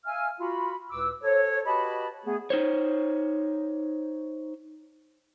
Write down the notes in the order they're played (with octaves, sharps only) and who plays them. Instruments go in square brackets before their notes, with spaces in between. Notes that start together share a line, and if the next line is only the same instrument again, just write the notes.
[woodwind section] E5 F5 G#5 F6
F4 F#4 B5
C#2 A2 B4 D6 E6
A4 C5 C#5
F#4 G4 B4 D#5 A5 B5
A3 B3 G#4
[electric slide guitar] D#4 C5 C#5